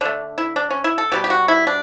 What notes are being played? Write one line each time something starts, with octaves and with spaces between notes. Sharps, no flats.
D3 A3 D4
E4
D4
C#4
E4
A4
B2 G3 B3 G4
G4
F#4
E4
D4